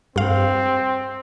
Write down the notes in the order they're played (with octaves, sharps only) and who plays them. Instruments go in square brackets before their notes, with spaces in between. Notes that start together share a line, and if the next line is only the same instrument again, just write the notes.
[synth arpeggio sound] G2 F5 [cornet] C4